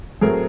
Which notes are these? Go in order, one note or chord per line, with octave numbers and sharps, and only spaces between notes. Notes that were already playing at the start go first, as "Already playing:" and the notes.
A2 F#3 A3 C4 G#4 A#4